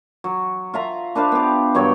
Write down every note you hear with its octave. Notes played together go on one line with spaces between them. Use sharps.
F#3
F4 E5 A#5
D4 B4 C5 F5
B3 G4
G2 F#3 C#5 G5